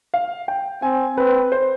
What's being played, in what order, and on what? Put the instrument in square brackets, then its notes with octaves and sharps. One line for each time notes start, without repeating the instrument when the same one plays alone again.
[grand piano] F5
G5
[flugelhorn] C4 [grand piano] G#5
[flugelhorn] C4 [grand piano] B4
[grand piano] C5